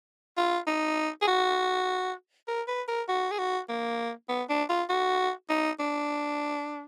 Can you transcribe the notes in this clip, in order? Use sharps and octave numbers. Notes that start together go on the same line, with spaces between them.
F4
D#4
G#4
F#4
A#4
B4
A#4
F#4
G#4
F#4
A#3
B3
D4
F4
F#4
D#4
D4